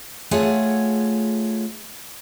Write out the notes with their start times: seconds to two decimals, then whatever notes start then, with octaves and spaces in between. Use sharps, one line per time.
0.31 A3 F4 G#4 C#5 F#5